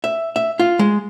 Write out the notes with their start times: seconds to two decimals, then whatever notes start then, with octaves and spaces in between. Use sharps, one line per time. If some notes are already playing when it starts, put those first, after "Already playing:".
0.04 E5
0.36 E5
0.59 F4
0.79 G#3